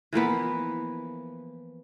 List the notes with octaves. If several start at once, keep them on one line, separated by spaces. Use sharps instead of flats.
E3 F3 A#3 B3